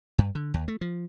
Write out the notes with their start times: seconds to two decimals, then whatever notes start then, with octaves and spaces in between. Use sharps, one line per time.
0.18 G2
0.35 D3
0.54 D#2
0.68 A3
0.81 F3